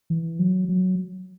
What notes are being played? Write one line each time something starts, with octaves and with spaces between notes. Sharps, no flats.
E3
F#3
F#3